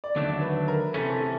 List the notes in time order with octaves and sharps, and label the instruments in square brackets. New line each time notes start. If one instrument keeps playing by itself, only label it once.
[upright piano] D5
[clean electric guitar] D#2 D3 F#3 A3 D4 [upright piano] C#5
[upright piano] B4
A#4
[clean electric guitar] C3 E3 A3 C#4 [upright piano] A4
[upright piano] A4